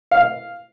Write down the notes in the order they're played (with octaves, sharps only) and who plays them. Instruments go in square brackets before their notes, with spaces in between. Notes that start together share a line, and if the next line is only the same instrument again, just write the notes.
[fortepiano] F5